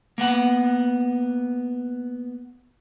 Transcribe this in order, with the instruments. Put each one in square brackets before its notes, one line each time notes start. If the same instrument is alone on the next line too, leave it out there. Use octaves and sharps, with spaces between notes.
[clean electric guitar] A#3 B3 F#5